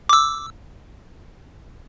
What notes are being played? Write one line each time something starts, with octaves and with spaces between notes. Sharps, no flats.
D6 E6